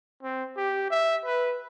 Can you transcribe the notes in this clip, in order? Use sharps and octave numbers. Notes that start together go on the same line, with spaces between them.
C4
G4
E5
B4